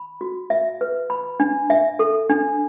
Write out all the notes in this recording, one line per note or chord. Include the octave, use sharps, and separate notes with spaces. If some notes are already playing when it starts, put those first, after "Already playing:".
Already playing: B5
F#4
E5
B4
B5
D4
E5
A4
D4